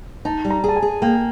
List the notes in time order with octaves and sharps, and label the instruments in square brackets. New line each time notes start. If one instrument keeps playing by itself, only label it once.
[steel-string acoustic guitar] D#4 [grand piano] A5
[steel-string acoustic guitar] G3
[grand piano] A#5
[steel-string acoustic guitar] G#4 [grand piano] A5
[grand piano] G#5
[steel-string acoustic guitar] G#4
[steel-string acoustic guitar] A#3 [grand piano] G5